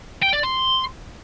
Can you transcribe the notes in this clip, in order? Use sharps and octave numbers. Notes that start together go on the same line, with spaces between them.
G5
D5
C6